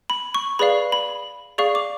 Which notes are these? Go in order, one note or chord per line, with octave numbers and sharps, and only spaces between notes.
B5
C#6
G#4 B4 D5 F5 B5
B5
G#4 D5 F5 C#6
D6